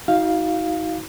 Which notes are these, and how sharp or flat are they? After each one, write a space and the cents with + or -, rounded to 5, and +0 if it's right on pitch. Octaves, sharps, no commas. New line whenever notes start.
D#4 +40 F#4 +0 F5 +0